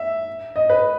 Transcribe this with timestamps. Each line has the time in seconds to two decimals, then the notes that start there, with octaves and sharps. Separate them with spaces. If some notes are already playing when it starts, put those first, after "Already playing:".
Already playing: E5
0.56 D#5
0.70 B4